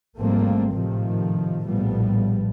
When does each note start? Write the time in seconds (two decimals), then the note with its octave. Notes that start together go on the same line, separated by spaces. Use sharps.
0.18 G#1 F3 G3 A3 A#3 C4
0.71 A2 C3 D#3 F3
1.64 A#1 A2 F3 G3 B3